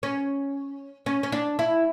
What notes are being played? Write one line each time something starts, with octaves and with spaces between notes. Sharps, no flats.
C#4
C#4
C#4
D4
E4